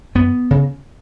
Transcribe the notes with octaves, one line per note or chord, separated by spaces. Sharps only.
F#2 B3
C#3